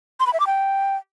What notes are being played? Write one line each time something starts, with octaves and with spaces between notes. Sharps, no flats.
C6
B5
E5
D6
G5